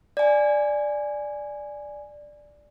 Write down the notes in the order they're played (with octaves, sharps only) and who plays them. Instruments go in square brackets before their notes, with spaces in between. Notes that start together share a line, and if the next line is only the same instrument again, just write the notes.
[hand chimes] D5 G#5